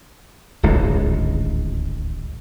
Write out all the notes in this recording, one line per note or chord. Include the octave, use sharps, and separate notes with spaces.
D1 G#1 C#2